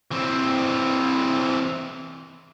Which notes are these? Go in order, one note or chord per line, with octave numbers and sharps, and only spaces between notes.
E3 C4